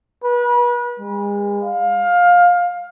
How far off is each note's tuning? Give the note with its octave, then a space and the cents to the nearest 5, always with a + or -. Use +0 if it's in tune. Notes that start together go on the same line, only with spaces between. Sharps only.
B4 -35
G#3 -40
F5 +20